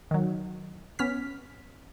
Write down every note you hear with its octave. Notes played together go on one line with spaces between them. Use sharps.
D#3 F#3
B3 C#4 F6 B6